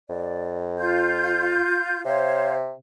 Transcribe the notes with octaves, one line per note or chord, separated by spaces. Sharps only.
F2 D5
F4 G6
C3 C5 C#5 F5